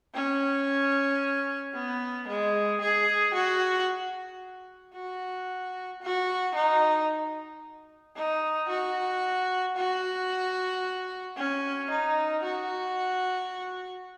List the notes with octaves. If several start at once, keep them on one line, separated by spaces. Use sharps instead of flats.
C#4
B3
G#3
G#4
F#4
F#4
F#4
D#4
D#4
F#4
F#4
C#4
D#4
F#4